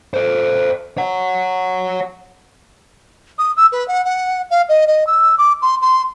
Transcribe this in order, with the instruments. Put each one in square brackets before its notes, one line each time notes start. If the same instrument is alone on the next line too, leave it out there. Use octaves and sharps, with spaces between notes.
[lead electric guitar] A4 C5
C#5 F#5
[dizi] D#6
E6
B4
F#5
F#5
F5
D#5
D#5
E6
D6
C6
C6